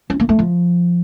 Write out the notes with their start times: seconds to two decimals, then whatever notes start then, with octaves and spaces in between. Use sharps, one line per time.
0.10 C#4
0.20 A#3
0.29 A3
0.39 F3